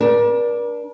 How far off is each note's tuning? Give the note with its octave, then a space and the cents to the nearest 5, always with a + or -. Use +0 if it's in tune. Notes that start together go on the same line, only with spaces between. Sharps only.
D4 +0 A#4 +45 A5 +10